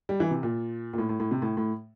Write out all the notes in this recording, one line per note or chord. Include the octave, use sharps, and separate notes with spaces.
G3
E3
C3
A#2
A#2
A2
A2
A2
C3
A2
A2